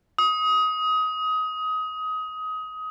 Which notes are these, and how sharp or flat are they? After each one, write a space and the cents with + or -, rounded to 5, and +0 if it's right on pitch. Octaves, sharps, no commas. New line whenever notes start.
D#6 +20